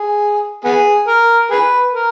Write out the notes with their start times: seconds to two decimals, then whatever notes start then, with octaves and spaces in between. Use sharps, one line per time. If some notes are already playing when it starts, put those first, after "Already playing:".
Already playing: G#4
0.65 B3 G#4
1.07 A#4
1.51 G#4 B4
1.93 A#4